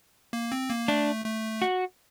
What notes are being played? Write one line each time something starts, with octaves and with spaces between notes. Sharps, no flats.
A#3
C4
A#3
A3 D4
A3
F#4